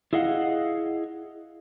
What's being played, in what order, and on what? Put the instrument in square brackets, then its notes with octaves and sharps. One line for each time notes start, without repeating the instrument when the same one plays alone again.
[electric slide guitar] E4 G#4 D#5 F5 F#5